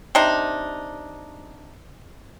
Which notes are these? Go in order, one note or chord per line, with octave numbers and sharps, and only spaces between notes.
C3 D4 D#4